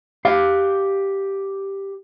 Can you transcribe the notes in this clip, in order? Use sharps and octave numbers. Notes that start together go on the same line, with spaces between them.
G4 F5